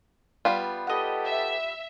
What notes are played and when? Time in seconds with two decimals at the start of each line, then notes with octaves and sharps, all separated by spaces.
0.45 G3 B3 F4
0.87 G4 A4 B4 D#5 F#5
1.25 E5